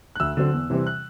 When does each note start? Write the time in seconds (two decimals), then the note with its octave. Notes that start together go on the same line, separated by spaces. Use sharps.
0.16 F#6
0.20 D2 E6
0.37 D3 F#3 C4
0.53 E2
0.70 C3 E3 G3 C4
0.87 F#6